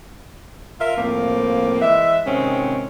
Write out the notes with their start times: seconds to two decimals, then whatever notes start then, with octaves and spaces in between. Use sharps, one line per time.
0.80 F4 A#4 E5
0.96 A2 F3 A#3 C4
1.81 E3 G#3 E5
2.26 G#2 C3 D#3 C4 C#4